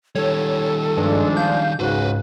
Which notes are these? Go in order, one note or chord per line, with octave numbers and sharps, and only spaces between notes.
D#3 G3 A4 C#5
G2 F3 G#3 D4
F5 G6
C#2 G#2 C#3 F#4 B4 C5